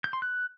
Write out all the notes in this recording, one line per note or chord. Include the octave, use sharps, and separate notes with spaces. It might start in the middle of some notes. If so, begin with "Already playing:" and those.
G6
C6
F#6